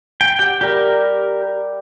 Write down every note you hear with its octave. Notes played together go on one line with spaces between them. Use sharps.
G5
G4 F#5 G5
G3 G4 A#4 E5